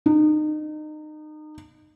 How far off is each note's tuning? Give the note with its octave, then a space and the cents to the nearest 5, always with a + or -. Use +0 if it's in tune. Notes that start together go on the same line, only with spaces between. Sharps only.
D#4 -30